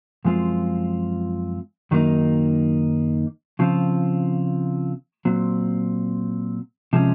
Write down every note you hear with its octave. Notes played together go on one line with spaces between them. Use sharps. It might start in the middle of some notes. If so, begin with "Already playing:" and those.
F#2 F3 G#3 C4 F4
F#2 D#3 F#3 A#3 D#4
C#3 F3 C4 F4
A#2 F#3 C4
C3 F3 G#3 C#4